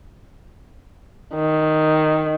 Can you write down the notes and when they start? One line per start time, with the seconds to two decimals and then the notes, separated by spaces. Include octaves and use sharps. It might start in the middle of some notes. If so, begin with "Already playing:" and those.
1.34 D#3